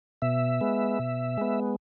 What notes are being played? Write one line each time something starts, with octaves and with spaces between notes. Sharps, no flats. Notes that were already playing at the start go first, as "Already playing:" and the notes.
B2 E5
G#3 B3
B2
G#3 B3